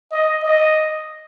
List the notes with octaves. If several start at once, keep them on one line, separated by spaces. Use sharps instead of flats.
D#5
D#5